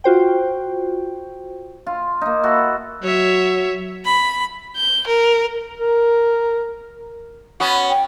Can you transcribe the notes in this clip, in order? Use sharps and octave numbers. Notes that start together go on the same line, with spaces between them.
F4 F#4 C5 G5
F4
A#3 D#4
E4 F#4 A4
F#3 C#5 E5
B5
G6
A#4
A#4
B3 C#4 F#4
G5